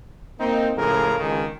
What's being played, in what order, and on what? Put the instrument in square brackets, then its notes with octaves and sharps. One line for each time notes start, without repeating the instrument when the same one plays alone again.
[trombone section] A#3 C4 D#4
C#2 A2 C#3 F3 G#4 A#4
G#1 C#2 D#3 G#4